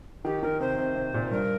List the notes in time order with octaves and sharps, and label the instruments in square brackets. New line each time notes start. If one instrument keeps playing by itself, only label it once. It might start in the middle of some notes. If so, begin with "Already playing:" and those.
[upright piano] D#3 [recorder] G4
[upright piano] D#3 [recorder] A#4
[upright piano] C3 [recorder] C5
[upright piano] C3
C3
A#2
[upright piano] G2 [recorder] A#4